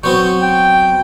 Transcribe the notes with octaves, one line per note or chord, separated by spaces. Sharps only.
F#3 B3 C4 C#6 G6
G5